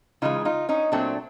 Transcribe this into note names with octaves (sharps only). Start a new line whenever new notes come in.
C#3 E3 G#3 D#4 F4
D#4 F4
C#4 D#4
A#2 F#3 A3 C4 D4